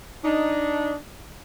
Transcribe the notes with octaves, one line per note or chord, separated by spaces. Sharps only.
D4 D#4